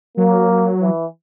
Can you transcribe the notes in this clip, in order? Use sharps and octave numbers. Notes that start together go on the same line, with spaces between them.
F#3 A#3
E3